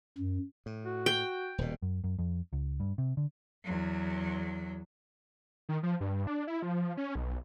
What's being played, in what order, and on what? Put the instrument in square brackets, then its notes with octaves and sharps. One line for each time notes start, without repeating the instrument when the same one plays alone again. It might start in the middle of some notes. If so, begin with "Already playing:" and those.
[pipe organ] F#2
[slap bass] A2
[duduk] F#4
[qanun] G5
[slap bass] D#1 B2
[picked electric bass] F#2
F#2
F2
C#2
G2
C3
D3
[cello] E2 F#3
[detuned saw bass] D#3
F3
G2
D4
E4
F3
C#4
B1